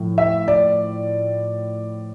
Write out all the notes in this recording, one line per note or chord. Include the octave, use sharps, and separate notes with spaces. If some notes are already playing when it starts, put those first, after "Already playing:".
Already playing: A2 F3
E5
D5